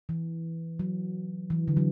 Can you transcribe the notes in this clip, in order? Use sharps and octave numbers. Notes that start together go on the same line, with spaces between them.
E3
F#3
E3
D3
F#3